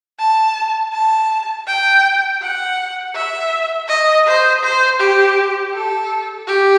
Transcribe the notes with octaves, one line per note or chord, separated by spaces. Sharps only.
A5
A5
G5
F#5
E5
D#5
C5
C5
G4
A4
G4